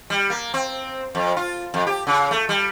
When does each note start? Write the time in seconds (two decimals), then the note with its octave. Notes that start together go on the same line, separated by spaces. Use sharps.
0.10 G3
0.30 A#3
0.54 C4
1.15 F2
1.37 F4
1.74 F2
1.87 G4
2.07 C#3
2.31 A3
2.49 G3